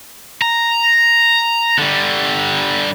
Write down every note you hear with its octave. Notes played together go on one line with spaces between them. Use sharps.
A#5
D3 G3